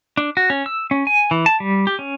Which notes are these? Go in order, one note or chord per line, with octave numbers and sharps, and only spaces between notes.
D4
F#4
C#4
E6
C#4
G#5
E3
A5
G3
G4
C#4